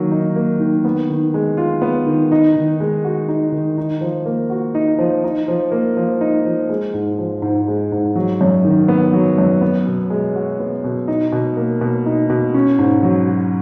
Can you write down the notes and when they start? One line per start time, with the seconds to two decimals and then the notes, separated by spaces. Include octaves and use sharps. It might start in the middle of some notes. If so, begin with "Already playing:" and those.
Already playing: D#3 F#3 A#3
0.11 D#4
0.36 A#3
0.60 D#3
0.85 B3
1.10 D#3
1.34 G#3
1.57 F4
1.82 B3
2.07 D#3
2.32 D#4
2.56 D#3
2.80 G#3
3.04 F#4
3.28 D#4
3.52 D#3
3.78 D#4
4.01 F3
4.26 A#3
4.50 F#4
4.75 D#4
4.98 F3
5.24 D#4
5.48 F3
5.72 A#3
5.97 F3
6.21 D#4
6.45 F3
6.69 G#3
6.94 G#2
7.19 F3
7.42 G#2
7.68 G#3
7.92 G#2
8.16 F#3
8.41 F#2
8.65 D#3
8.88 B3
9.13 F#3
9.38 F#2
9.62 B3
9.87 B2
10.10 G#3
10.36 F#4
10.60 B3
10.84 B2
11.08 D#4
11.32 B2
11.57 A#3
11.81 B2
12.06 D#4
12.30 B2
12.54 C#4
12.79 G#2
13.03 F#3
13.27 F#4